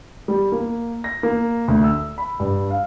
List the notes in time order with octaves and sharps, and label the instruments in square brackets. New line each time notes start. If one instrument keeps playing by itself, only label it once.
[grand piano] G3
A#3
A#6
A#3
D2
E6
B5
G2
F5